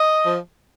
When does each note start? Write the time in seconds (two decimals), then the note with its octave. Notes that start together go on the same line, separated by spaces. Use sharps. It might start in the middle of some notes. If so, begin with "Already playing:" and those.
Already playing: D#5
0.24 F3